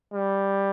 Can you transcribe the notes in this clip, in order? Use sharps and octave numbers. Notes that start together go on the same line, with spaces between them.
G3